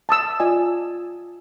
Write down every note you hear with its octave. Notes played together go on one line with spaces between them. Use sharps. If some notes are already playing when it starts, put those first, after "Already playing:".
A5 D#6 E6
F4 D5 D#5 G#5